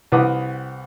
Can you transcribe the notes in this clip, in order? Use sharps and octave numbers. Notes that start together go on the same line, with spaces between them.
C2 F#4 B4 D6 D#6